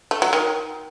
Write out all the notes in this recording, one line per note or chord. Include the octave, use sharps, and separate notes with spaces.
A3
F#3
D#3